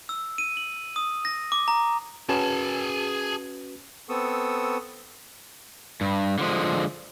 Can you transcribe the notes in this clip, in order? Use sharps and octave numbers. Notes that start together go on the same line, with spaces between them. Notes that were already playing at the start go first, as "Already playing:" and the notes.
E6
D#7
F#7
D#6
A#6
D6
A#5
C#4 F#4 G#4 B4 A5
B3 C4 A4 C#6 D#6 E6
G2
D3 F3 G#3